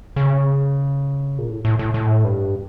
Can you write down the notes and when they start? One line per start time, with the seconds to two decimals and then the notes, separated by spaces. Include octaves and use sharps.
0.16 C#3
1.38 A#2
1.49 A2
1.65 A2
1.79 A2
1.94 A2
2.24 G2